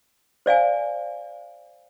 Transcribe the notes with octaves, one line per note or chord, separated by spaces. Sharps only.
C5 D5 F5 G#5